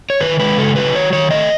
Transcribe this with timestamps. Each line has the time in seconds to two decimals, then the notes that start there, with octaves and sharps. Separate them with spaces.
0.10 C#5
0.20 D#3 B4
0.40 G#3 B4
0.58 C#3 A4
0.76 F#3 B4
0.95 D#3 C#5
1.13 D#3 C#5
1.31 A3 D#5